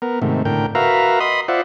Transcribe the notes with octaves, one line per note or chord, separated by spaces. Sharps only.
B3 A#4
G#2 C3 D#3 A3
A2 D3 A#4 G5
F#4 A#4 B4 E5 F5 A#5
D#5 B5 C6 D#6
F4 C5 D5 E5 F#5